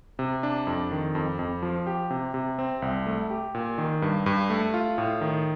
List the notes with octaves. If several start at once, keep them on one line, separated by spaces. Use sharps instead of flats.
C3
D4
F2
D#3
F2
F2
F3
G4
C3
C3
C4
C2
A3
G4
A#2
D#3
G2
G2
A3
F4
A2
D#3